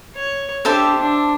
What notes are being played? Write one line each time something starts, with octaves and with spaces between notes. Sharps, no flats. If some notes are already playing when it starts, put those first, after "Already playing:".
C#5
D4 G4 A4 C5 E5
D4